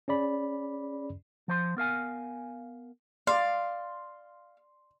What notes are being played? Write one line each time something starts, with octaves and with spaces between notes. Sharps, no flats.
C#4 G#4 D5 B5
F3 C5 C6
B3 A#4 F5 G#5
D5 F5 C6